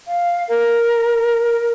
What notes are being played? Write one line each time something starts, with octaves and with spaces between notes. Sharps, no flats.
F5
A#4